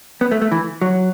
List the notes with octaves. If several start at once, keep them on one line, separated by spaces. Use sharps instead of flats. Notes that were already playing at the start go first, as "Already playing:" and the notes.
B3
A3
A3
E3
F#3